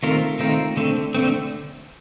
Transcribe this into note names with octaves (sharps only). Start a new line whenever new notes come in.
D#3 A3 C4 F4 A#4
D#3 A3 C4 F4 A#4
D3 A3 C4
D3 A3 C4